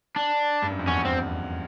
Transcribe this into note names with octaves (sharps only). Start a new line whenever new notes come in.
D4
G2
F#2
F2
E2 C#4
C4